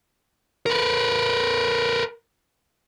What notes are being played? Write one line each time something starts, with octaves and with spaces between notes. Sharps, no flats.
A#4 B4